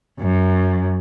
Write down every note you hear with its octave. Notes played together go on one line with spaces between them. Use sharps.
F#2